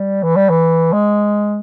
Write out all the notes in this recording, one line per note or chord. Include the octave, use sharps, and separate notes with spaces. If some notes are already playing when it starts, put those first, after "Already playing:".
Already playing: G3
E3
G3
E3
G#3